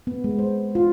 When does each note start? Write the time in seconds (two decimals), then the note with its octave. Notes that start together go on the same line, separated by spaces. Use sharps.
0.07 B3
0.24 G#3
0.39 C5
0.75 F4